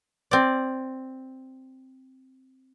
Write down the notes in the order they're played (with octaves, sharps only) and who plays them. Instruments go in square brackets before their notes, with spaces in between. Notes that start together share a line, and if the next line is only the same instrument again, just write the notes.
[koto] C4 D5